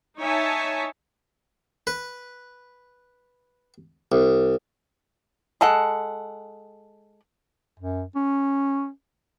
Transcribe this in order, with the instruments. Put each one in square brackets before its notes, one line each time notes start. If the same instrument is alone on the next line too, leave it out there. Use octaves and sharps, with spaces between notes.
[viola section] D#4 C#5 E5 G#5 A5
[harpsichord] B4
C2
[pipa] G#3 A4 F#5
[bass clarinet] F#2
C#4